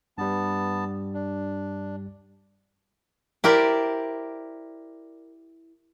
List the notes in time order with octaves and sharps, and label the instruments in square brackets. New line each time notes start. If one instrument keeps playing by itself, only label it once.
[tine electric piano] G2 G3 [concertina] B3 A5
[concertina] D4
[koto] E4 G4 A#4 C5 D5